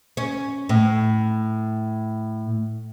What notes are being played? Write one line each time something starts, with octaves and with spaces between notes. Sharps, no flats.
C#4
A2